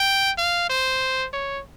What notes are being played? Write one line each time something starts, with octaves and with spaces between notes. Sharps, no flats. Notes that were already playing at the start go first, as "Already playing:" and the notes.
Already playing: G5
F5
C5
C#5